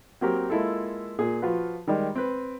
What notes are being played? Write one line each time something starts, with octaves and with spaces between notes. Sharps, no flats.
F#3 A#3 C4 F#4 G4 A#4
G#3 A#3 E4 F4 A4
A#2 G#4
F3 F4 F#4 B4
D#3 G3 G#3
C4 B4